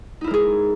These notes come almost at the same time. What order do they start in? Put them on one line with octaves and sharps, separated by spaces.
D#4 E4 A#4 G#3 G#4